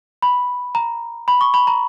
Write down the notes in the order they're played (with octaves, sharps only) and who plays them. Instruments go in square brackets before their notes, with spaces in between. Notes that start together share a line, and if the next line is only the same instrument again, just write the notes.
[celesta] B5
A#5
B5
C#6
B5
A#5